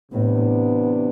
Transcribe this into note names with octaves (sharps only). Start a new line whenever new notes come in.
A2 C3 E3 B3 D4